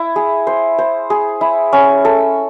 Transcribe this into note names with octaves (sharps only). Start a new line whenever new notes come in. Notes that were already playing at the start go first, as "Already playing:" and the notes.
Already playing: E4
G#4
C5
C5
G#4
E4
C#4
A4